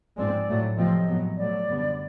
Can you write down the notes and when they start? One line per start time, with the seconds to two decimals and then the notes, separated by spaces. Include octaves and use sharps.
0.17 G#2 F3 G#3 C4 D5
0.48 A2 F#3 A3
0.77 C3 F3 A3 C4 D#5
1.07 A2 F#3 B3
1.37 B2 F#3 A3 D5
1.67 F#2 D3 G3 B3